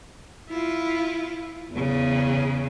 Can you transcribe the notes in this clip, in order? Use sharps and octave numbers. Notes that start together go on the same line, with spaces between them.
E4 F4
E2 C#3